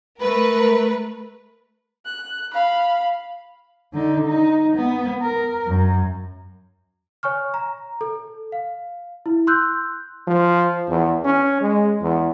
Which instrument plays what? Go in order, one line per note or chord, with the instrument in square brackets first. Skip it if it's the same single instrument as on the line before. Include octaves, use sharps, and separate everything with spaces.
[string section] A3 A#4 B4
[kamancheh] F#6
F5 B5
[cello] D3 D#4
D#4
B3
A#4
F#2
[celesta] C#5 G#5 C#6 F6
A#5
A4
F5
E4
C6 E6 F#6 G6
[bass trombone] F3
E2
C#4
G#3
E2